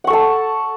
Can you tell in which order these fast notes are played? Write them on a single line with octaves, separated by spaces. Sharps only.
F#5 C#6 A4 A5